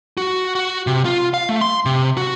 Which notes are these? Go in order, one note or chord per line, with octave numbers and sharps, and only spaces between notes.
F#4
F#4
C3
F4
F5
A3
C6
C3
F#4